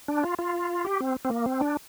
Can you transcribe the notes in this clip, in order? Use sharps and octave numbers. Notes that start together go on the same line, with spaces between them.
D4
F4
F4
G4
C4
C4
A#3
C4
D4